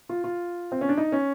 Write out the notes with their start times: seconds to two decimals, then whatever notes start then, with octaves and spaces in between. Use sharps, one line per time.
0.09 F4
0.24 F4
0.72 C4
0.81 C#4
0.89 D4
0.97 D#4
1.12 C#4